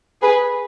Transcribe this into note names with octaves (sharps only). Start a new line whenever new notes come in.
G#4 B4